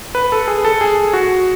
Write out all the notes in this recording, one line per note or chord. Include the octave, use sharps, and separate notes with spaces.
B4
A4
G#4
A4
G#4
F#4